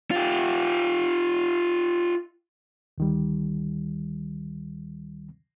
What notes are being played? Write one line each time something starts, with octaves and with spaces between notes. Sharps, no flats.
F4 G4
D2 D#3 G3